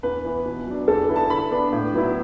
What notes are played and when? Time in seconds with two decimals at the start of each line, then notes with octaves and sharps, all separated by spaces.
0.03 E2 B4
0.25 E3 B3
0.45 B2
0.67 F#3 D4
0.88 E2 A4
1.08 D3 B3 E4
1.16 A5
1.30 D3 B5
1.51 B3 D4
1.72 A2
1.93 F#3 B3 E4